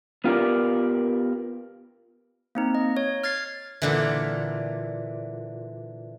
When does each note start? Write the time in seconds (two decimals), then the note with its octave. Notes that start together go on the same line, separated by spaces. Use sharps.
0.24 B3 F4 G4 A#4 D5
2.55 A#3 C4 D#4
2.75 D#5
2.97 C#5
3.24 F6 G#6 A6 C7
3.82 A#2 D3 E3